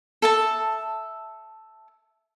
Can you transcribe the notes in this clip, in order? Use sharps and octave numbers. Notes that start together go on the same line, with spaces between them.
A4 E5 A5